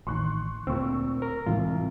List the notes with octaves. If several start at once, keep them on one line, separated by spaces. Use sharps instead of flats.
A1 D#3 C6 C#6 F#6
D2 A#2 A#3 C4 C#6 E6
A#4
C2 G#2 E3 G#3 F4